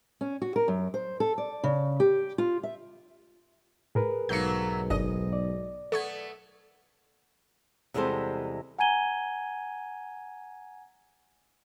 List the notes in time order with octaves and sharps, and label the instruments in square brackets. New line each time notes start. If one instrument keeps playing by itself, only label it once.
[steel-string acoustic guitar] C#4
F#4
A#4
F#2
C5
A4
D5
C#3
G4
F4
E5
[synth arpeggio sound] A2 [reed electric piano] G#4 A#4 B4
[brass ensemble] B1 G#2 [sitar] F#3 A3 A#3 [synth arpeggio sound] G6 C#7
[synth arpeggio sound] G1 D4 [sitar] D#5
[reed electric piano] D5
[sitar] A3 B3 [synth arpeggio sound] A4 C#6 G#6
[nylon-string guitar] E2 C3 G3 G#3 A4 C5
[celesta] F#5 G#5 A#5 G#6 D#7 G7